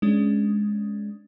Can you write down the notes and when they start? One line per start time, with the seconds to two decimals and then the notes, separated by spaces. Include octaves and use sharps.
0.02 G#3 C#4 D4